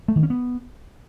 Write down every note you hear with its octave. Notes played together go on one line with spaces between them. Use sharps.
A3
D#3
C#4
B3